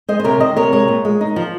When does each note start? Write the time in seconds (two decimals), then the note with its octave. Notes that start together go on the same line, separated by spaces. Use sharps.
0.08 G#3 C5 D#5
0.20 C5
0.24 C3 A#4 C#5
0.40 D#3 C5 D#5
0.56 C3 A#4 C#5
0.72 G#3 A#4 C#5
0.88 A#2
1.05 G#3
1.21 D#4
1.36 F3